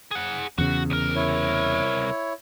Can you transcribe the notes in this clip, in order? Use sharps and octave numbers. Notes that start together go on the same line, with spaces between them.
G#4 F#5
E2 C#3 F#4
C2 A#4
E4 C#5